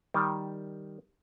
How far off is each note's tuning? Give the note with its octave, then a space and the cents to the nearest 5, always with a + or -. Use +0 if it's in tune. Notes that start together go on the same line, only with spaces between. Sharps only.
D#3 +0 G3 +0